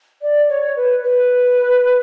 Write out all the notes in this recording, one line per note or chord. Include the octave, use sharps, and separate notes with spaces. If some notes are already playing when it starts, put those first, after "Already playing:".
D5
C#5
B4
B4